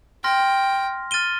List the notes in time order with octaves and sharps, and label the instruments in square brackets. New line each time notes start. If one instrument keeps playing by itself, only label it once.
[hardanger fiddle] G5 [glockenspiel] C6 F6 A#6
[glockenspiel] F6 A6 D#7 G7